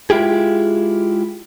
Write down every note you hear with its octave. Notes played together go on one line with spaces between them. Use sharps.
G#3 E4 F4 G4 G#4